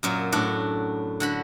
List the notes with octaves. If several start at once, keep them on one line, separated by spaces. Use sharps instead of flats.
F#2 A#2 F#3
A2 D4 F#4
D3 F#4 B5